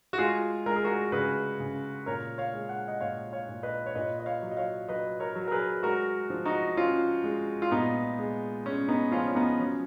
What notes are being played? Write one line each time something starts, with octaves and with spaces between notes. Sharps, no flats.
F#4
G#3 F4 G#4
G#3 A#4
G#4
F#4 A#4
C#3 G#4 B4
C#3
A#2 A#4 C#5
C#5 F5
G#3
F#5
D#5 F#5
A#2 C#5 F5
C#5 F5
A#2
B4 D#5
C#5
A#2 B4 D#5
D#5
C#5 F5
F#3
D#5
C#5 F5
F#3 B4 D#5
A#4 C#5
F#3
A#4
G#4 B4
G#3 F#4 A#4
F3
D#4 F#4
F3 C#4 F4
G#3
F4
A#2 B3 D#4
G#3
G#3 C#4
B3 D#4
F3 C#4 F4
C#4
B3 D#4
F#3 C#4